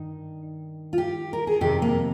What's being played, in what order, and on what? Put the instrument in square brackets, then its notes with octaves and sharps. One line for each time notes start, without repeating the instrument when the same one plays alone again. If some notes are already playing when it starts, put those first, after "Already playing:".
Already playing: [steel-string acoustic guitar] G2 D#3 D#4
F4
G4
A#4
G#4
F2 C3 D#3 G4
A#3